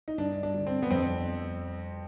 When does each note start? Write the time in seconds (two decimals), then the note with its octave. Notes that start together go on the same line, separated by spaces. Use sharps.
0.08 D#4
0.18 G2 D4
0.43 D4
0.54 D3
0.67 C4
0.82 B3
0.91 F2 C4